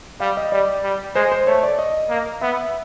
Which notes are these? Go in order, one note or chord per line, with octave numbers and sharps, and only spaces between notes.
G3 F5
D#5
G3 D5
G3
G#3 C5
C5
A3 C#5
D5
D#5
A#3
B3 E5